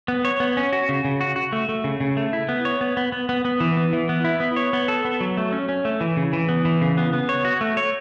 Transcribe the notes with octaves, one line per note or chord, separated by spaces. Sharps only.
B3
C#5
B3
C#4
F#4
C#3
C#3
F#4
F#4
A3
A3
C#3
C#3
A3
E4
B3
C#5
B3
B3
B3
B3
B3
E3
B3
E3
B3
E4
B3
C#5
B3
A4
B3
F#3
A3
C#4
C#4
A3
E3
C#3
E3
B3
E3
C#3
B3
B3
C#5
F#4
A3
C#5